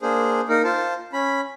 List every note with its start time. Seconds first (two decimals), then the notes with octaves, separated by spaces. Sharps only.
0.02 A#3 D4 G#4 C5
0.49 A#3 D#4 A#4
0.64 F4 C5 A5
1.13 C#4 B5